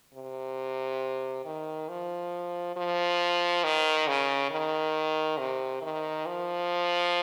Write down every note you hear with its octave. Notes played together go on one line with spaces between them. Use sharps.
C3
D#3
F3
F3
D#3
C#3
D#3
C3
D#3
F3